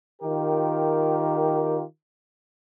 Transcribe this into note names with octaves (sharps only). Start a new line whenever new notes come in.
D#3 F4 G4 A#4